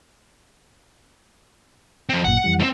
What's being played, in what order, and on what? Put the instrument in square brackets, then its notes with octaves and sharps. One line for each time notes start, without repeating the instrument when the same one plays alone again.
[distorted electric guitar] F3 C4
[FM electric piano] G#1 F#2 A#2 [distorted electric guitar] F#5
[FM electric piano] F2 E3 G3
[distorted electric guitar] A2 C4